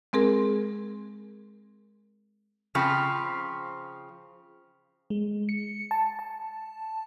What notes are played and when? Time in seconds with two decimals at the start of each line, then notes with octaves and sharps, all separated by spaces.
0.13 G#3 C4 G#4 A#4
2.75 C#3 F3 C4 B5 C#6 F6
5.10 G#3
5.49 C#7
5.91 A5
6.19 A5